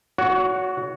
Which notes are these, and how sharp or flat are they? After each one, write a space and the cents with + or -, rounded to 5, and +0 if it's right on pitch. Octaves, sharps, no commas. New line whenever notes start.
F#4 +0 C#5 +35